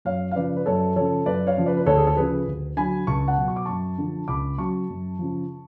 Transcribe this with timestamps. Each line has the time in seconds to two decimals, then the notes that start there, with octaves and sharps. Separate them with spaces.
0.05 F#2 C#5 F5
0.31 F5
0.35 C#3 F3 B4 D5
0.57 B4
0.66 F#2 A4 C#5
0.96 C#3 F3 A4 C#5
1.26 F#2 B4 D5
1.47 C#5 F5
1.57 C#3 F3
1.66 B4 D5
1.77 B4
1.86 D2 A4 C#5
1.97 G#4
2.07 A4
2.17 C#3 F3 G#4 B4
2.47 D2
2.77 D3 F#3 G#5 B5
3.07 C#2 A5 C#6
3.28 F#5 A5
3.37 B2 F#3
3.48 C#6
3.56 D6
3.65 F#2 A5 C#6
3.98 D3 F3
4.28 C#2 B5 D6
4.58 C#3 F#3 A5 C#6
4.89 F#2
5.19 C#3 F3